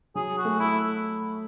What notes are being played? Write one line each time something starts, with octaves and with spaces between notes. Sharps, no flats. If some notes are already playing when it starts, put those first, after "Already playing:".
F#3 G#4
F#4
A3
E4